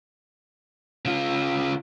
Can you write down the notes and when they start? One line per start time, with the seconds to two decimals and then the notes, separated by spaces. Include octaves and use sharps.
1.05 C#3 F4